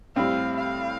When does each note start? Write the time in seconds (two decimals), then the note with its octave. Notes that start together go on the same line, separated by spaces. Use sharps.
0.16 A2 G3 C4 F5
0.56 F5